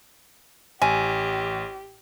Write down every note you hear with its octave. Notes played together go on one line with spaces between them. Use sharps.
A1 G4 G#5